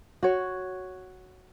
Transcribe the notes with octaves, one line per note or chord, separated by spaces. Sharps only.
F#4 C#5